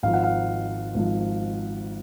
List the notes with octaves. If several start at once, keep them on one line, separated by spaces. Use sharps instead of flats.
G#1 G#2 F3 F5
F#5
F5
G#1 G#2 F3